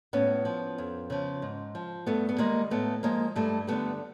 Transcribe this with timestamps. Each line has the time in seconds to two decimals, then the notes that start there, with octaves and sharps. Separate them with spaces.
0.13 A2 B3 C#4
0.45 F3
0.78 F2
1.10 C#3 F3
1.42 G#2
1.75 F3
2.06 G2 A3 B3
2.29 B3
2.38 D#3 G3 G#3 A#3
2.71 A2 A3 B3
3.03 F3 G#3 A#3
3.36 G2 G3 A3
3.67 D3 G3 A3 B3